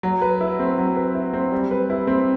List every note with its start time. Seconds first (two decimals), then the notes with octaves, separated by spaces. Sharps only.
0.03 F#3
0.22 B4
0.41 E4
0.59 C4
0.78 F#3
0.96 B4
1.15 E4
1.33 C4
1.52 G3
1.71 B4
1.90 E4
2.07 C4